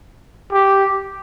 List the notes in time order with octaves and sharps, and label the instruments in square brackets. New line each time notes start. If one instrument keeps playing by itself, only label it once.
[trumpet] G4